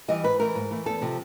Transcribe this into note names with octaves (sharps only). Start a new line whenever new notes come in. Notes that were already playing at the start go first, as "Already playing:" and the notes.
E3 G3 D#5
G#2 B4
E3 A3 A#4
G#2
E3 A3
E2 A4
C3 F3